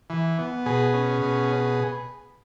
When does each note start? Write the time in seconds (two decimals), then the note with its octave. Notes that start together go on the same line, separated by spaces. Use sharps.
0.10 E3
0.39 B3
0.66 B2 G#4 B4
0.93 C#4
1.22 B2